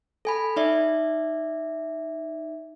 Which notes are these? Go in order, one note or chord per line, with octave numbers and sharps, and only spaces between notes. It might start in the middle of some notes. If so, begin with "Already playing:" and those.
A4 G#5 B5
D#4 D5 E5